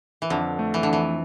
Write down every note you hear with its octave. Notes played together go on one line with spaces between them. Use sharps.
E3
F2 D3
A3
E3
D3
F2 E3